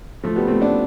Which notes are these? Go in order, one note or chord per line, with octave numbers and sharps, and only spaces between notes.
F3 A3
G3 B3
A3 C4
B3 D4